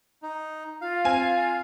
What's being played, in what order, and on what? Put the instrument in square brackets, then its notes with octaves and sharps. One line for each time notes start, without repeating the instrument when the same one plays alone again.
[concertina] D#4
[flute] F4 [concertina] F5
[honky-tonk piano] C4 G#5